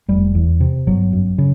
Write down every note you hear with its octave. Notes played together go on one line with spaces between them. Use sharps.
F1 G3
E2
C3
G1 F#3
F#2
C#3